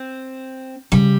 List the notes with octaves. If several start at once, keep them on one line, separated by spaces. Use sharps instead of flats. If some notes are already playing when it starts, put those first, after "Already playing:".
Already playing: C4
C#3 G3